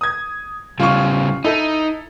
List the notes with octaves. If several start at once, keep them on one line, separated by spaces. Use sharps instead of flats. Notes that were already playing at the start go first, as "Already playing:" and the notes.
D#6 G#6
C#3 G3 F4 C#6
D#4 E4 A4